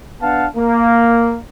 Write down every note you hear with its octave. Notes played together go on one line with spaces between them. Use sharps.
B3 D4 F5 F#5 A5
A#3